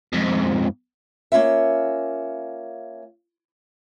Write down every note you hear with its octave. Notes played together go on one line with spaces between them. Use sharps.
F2 G#2
A#3 C#4 F4 E5